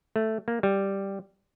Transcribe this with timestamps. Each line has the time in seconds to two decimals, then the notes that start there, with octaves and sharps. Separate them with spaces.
0.16 A3
0.48 A#3
0.63 G3